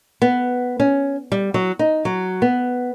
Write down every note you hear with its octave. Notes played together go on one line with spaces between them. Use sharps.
B3
C#4
G3
F#3
D#4
F#3
B3